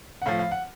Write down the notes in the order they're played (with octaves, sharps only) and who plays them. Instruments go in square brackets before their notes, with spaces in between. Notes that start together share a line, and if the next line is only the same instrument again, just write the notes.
[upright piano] F#5
A2 F3 F5
F5
F#5